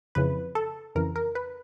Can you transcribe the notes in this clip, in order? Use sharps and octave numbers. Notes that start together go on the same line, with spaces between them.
F2 C#3 E3 B4
A4
F2 C#3 E3 A#4
A#4
B4